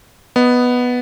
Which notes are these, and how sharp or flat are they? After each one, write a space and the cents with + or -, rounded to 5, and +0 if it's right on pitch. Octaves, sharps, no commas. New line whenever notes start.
B3 +0 D#5 +0